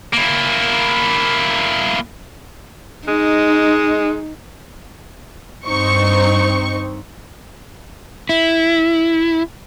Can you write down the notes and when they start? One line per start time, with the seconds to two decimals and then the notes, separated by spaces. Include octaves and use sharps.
0.13 A#3 E4
3.08 G#3 D#4
5.66 G2 C4 D#4 C5 C#6 C#7
8.29 E4